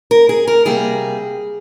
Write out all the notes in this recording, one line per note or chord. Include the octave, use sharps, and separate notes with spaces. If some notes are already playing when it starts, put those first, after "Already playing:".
A#4
G#4
A#4
C3 G3 A#3 G#4